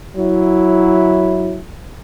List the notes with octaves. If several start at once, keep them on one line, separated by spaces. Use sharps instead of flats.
F#3 E4